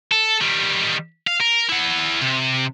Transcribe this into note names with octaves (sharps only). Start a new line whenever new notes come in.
A4
D#3 G3
F5
A#4
E4 F#5
C3